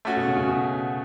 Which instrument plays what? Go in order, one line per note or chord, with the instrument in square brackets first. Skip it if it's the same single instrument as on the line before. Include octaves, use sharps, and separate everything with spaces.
[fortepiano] A3 C#4 F#4
[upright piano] B2
C#3
C#3
B2